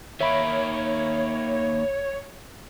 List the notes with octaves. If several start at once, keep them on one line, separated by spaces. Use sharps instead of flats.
D#3 A#3 C#5 E5 B5 D7